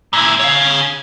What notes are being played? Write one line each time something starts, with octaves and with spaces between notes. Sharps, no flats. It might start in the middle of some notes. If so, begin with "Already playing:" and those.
A#2 E4
C#5 F5